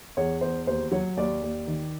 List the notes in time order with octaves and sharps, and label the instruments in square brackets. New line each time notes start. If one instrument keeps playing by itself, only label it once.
[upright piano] E2 C#5
E2 C5
D#2 C5
F#3 C#5
D#2 D5
D#2
D#3